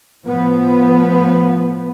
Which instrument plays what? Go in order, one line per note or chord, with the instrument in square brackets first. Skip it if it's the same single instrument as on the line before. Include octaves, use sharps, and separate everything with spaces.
[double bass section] A2 F3 B3